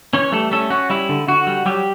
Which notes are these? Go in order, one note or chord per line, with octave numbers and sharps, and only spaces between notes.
E3 C#4 C#5
G3 A3 A4
A3 C#4 A4
C#4 F#4
G3 E4
D3
D3 F#4
G3
F#3 G3 G4